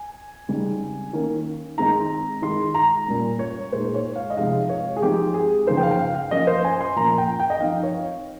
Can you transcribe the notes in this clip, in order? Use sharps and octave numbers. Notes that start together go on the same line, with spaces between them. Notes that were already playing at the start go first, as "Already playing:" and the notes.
Already playing: G#5
C#3 G3 C4 D#4
D#3 A#3 C#4
D#3 G#3 C4 D#4 A#5
D#3 G#3 D#4 C6
A#5
A#2 G3 C#4
C#5
A#2 G#3 D#4 C5
C#5
F5
D#5
C3 F3 G#3 D#4 F5
C#5
G#4
F3 G#3 C4 D#4 G4
G#4
C#3 F3 A#3 D#4 C5
G5
F5
G5
F5
F5
F3 A#3 C#4 D#5
C5
G#5
C6
A#2 F3 A#3 C#4 A#5
G5
G5
D#5
F3 C4 D#4 F5
C#5